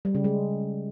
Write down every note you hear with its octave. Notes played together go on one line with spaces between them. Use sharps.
G3
C#3
G#3